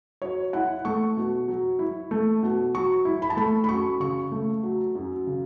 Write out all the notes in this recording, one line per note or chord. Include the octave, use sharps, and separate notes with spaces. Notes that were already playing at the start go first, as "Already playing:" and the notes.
F#3 C#5
E4 F#5
A3 C#6
B2
F#3
E4
A3
B2
F#3 C#6
E4
B5
A5
A3 B5
B5
F#2 C#6
C#3 C#6
A3
F#3
F#2
C#3